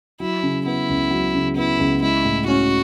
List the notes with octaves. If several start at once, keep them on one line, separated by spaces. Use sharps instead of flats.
F#3 E4
C#3
B3 E4
C#2
F#3
C#3
B3 E4
C#2
G#3 E4
A2
C#4 F#4